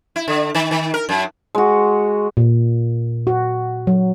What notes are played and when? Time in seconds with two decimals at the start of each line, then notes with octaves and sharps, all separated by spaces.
0.16 E4
0.28 D3
0.55 D#3
0.71 D#3
0.94 A#4
1.09 F#2
1.55 G#3 F#4
2.37 A#2
3.27 F#4
3.87 F#3